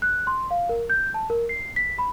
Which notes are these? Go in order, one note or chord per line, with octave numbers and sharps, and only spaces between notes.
F#6
C6
F5
A#4
G6
A5
A#4
C7
B6
B5